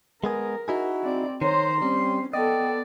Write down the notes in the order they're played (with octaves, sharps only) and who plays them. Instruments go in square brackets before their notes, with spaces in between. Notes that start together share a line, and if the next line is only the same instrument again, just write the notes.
[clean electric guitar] G#3 B3 G#4 [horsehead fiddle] A#4
[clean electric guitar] D#4 E4 G#4 [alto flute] F#4
[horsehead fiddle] C4 D5
[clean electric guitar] D#3 [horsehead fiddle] C5 A#5 [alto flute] C#5 [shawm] C6
[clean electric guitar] G3 [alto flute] C4 [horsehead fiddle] C#4
[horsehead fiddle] B3 A4 [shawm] D5 [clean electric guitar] D#5 [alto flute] G5